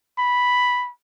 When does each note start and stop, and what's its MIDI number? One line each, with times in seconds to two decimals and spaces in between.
0.18 0.90 83